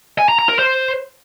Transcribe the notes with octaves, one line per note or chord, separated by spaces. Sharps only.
G#5
A#5
A#5
A#4
C5